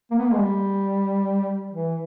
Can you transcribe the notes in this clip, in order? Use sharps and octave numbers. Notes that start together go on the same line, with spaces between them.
A#3
B3
A#3
G#3
G3
E3